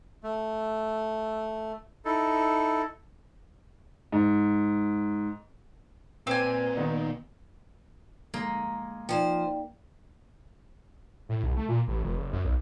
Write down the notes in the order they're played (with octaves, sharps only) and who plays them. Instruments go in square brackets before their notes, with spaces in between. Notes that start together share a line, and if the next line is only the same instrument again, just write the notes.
[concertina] A3
D#4 E4 A4
[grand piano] G#2
[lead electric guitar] A#2 [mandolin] C4 G#5 [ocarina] B4
[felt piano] D#3 B3 D#4
[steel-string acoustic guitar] G#3 [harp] A#3
[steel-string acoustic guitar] F3 C5 [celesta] D#4 D5 G5
[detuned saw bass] A2
C2
A3
A#2
A1
F1
F#1
F#2
B1